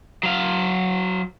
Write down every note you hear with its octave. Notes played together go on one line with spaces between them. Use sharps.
F#3 F5